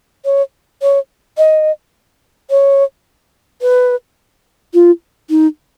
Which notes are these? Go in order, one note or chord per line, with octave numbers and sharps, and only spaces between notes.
C#5
C#5
D#5
C#5
B4
F4
D#4